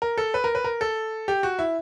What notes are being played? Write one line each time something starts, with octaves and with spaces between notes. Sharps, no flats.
A#4
A4
B4
A#4
B4
A#4
A4
G4
F#4
E4